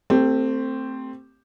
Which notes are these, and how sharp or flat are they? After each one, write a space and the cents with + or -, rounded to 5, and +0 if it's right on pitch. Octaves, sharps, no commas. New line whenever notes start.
A3 +30 C4 +0 G4 +0